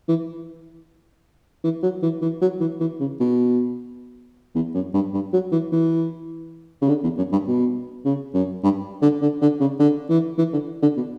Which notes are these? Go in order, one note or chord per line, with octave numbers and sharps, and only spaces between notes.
E3
E3
F#3
E3
E3
F#3
E3
E3
C#3
B2
E2
F#2
G2
G2
F#3
E3
E3
C#3
D3
E2
F#2
G2
B2
C#3
F#2
G2
D3
D3
D3
C#3
D3
E3
E3
D3
D3
B2